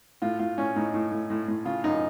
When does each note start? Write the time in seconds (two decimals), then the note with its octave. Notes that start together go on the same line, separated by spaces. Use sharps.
0.22 A2 F4
0.39 A2 F4
0.58 A2 C#4
0.76 A2 D#4
0.94 A2
1.12 A2
1.30 A2
1.48 A2
1.65 C#3 F4
1.84 F#2 D#4